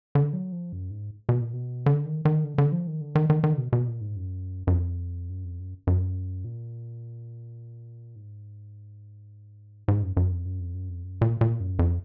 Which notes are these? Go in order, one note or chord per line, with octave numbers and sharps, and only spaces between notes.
D3
F#3
F3
F#2
G#2
B2
A#2
B2
D3
D#3
D#3
D3
D3
F3
D#3
D3
D#3
D#3
D#3
D3
B2
B2
A#2
G#2
F#2
F#2
F2
F#2
F2
F#2
F#2
A#2
G#2
G#2
F#2
F#2
F2
F#2
F2
F#2
F2
F#2
A#2
A#2
F#2
F2